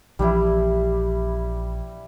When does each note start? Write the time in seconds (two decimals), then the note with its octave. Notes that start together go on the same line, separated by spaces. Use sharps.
0.19 A#1 E3 F3 G3 D4 E4